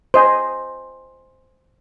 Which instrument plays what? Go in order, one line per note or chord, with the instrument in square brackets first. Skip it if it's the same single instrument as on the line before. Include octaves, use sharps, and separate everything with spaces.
[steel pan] C5 D#5 G#5